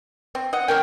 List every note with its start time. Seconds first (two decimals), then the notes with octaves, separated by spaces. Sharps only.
0.35 C4
0.53 D#5 F#5
0.68 A#3 C#4 A#4 G5